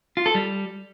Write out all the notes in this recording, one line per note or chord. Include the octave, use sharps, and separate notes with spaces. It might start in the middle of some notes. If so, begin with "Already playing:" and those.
F4
A4
G3